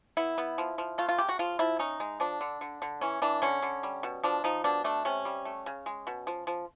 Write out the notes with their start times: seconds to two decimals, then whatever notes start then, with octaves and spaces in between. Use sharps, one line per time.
0.17 B3 E4
0.38 B3
0.58 F3
0.78 F3
0.98 A3 F4
1.09 F4
1.18 C#3 G4
1.29 F#4
1.39 F3 F4
1.59 F3 E4
1.79 C#4 D#4
2.00 G#3
2.20 F3 D4
2.41 D3
2.61 D3
2.82 D3
3.01 E3 C#4
3.22 E3 D4
3.42 D3 C#4
3.62 D3
3.83 G3
4.03 B2
4.24 F3 D4
4.44 F3 D#4
4.64 B2 D4
4.84 A3 D4
5.05 C3 C#4
5.25 G3
5.45 A3
5.66 C#3
5.86 G#3
6.07 B2
6.27 F3
6.47 F3